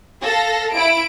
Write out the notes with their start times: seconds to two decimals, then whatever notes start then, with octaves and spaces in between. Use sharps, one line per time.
0.22 A4 F5 A5 A#6
0.71 E4 D7